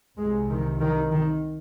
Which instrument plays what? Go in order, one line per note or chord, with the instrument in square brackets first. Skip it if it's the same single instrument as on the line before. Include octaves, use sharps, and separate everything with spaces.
[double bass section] C2 C3 G#3
D#3
D#3
D#3